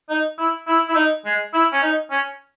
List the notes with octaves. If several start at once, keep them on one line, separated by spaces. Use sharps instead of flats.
D#4
E4
E4
E4
D#4
G#3
E4
C#4
D#4
C#4